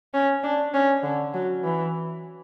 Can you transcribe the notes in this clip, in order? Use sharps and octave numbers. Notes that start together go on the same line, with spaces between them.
C#4
D4
C#4
D3
F#3
E3